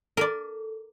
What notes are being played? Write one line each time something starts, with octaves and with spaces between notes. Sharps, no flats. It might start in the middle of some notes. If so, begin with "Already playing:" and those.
A4 A#4 D5